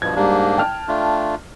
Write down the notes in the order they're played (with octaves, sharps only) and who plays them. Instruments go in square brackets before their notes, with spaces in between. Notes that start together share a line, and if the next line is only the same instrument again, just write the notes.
[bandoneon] G2 B2 F3 [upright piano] G#6
[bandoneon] G#2 A#3 D4 [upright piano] G3
[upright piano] G5 A5 F6
[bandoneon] A3 D4 F4